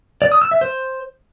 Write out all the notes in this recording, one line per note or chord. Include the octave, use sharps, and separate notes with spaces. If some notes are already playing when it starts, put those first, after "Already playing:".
D5
D#6
E6
E5
C5